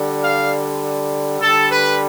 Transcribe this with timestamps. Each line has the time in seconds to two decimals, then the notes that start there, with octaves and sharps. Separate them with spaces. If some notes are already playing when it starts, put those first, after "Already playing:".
Already playing: D3 G3
0.24 F5
1.41 D3 G3 A4
1.71 B4